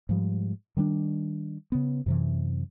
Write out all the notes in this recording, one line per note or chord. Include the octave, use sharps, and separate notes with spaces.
G#2 F3 G3
D#3 G3 A#3 D4
C#3 B3
F#2 C3 E3